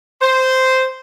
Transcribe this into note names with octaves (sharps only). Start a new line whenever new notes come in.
C5